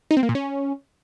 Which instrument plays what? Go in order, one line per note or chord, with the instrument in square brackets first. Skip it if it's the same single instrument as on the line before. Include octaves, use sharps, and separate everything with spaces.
[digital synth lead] D#4
C4
A#3
A#2
C#4